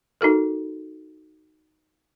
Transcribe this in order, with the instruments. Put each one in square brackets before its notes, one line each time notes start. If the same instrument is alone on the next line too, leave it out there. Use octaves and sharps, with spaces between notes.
[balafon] D#4 F#4 A4 A#4